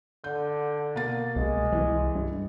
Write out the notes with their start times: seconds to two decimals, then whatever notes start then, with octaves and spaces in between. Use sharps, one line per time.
0.24 D3 G6
0.94 B2 A#3 A6
1.36 C2 G#3
1.72 C2 E3
2.15 G2